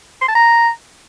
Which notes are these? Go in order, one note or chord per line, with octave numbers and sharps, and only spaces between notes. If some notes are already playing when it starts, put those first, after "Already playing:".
C6
A5
A#5